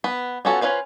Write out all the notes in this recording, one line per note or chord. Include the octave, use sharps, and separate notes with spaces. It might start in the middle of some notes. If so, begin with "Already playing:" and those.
B3 B4
B3 C#4 F4 F#4 A4
C#4 D#4 F4 B4 C5